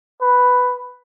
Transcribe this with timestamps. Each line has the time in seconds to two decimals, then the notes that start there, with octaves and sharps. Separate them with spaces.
0.22 B4